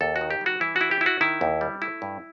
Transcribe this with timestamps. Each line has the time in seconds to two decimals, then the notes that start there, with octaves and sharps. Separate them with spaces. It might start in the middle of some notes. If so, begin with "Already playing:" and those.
0.01 D#2 A4
0.16 F#4
0.21 D#3
0.31 G4
0.41 G3 F#4
0.61 E3 E4
0.76 F#4
0.81 E4
0.91 G4
1.01 E4
1.06 F#4
1.21 D#3 E4
1.41 D#2
1.61 G3
1.82 A3 E4
2.02 G2